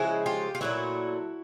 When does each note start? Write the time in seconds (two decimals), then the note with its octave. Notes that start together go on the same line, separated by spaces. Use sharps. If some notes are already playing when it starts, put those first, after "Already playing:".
Already playing: C#3 F3 G#3 E4 F#4
0.26 F4 G4
0.55 F4
0.61 A#2 F#3 A3 E4 F#4